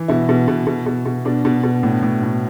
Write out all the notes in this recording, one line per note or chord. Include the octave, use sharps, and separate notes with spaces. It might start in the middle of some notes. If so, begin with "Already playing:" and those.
Already playing: E3
B2 E4
B2
B2
B2
B2
B2
B2 D4
B2
B2
A2 D4
A2
A2